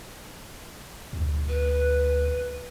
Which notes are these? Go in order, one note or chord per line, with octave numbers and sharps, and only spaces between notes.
D2
B4